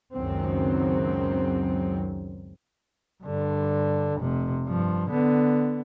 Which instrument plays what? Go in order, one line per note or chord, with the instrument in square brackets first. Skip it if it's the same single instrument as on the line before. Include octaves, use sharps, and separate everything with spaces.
[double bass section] C#2 F#2 D#3 F#3 C4
[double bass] G2 D3
F1 C3
G2 F3
D3 B3